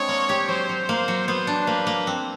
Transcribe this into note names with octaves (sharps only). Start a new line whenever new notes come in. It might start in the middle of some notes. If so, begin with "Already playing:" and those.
Already playing: G#3 C4 D4 C#5
A#3
G4
F#3 C5
F#3
A#3
F#3
B3 C5
D4
A#3 B4
A#3
C4